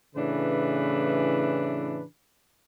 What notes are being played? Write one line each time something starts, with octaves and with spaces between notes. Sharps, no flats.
A2 C#3 E3 D4 B4